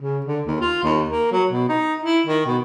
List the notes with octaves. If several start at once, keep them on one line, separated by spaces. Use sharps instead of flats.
C#3
D3
D#2
F4
D#2
A#3
F#3
B2
D#4
E4
D#3
B2